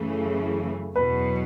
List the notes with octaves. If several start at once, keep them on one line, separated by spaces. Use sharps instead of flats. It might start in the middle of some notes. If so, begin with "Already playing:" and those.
Already playing: F#2 C#3 E3 A3
E2 B2 F#3 B4